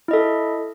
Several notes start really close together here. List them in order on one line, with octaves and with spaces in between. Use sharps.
E4 D#5 A4